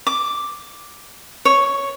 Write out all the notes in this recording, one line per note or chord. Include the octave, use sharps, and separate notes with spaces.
D6
C#5